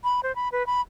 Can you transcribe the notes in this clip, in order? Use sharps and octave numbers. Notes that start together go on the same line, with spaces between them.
B5
C5
B5
B4
B5